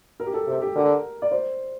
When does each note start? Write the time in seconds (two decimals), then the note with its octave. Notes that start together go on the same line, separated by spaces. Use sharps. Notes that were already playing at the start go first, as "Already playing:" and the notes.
0.20 A#4
0.26 G4
0.34 A4
0.47 C3 G4
0.62 G4
0.76 D3 A#4
1.22 D5
1.31 C5